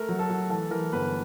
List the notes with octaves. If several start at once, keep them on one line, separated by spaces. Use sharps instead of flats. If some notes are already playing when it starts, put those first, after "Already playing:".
Already playing: A3 A#4
F#3
A4
F#3
E3 A4
E3 A#4
G1 B4